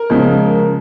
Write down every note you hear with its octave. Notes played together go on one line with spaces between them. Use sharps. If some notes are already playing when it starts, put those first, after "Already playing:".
Already playing: A#4
C#3 F3 G#3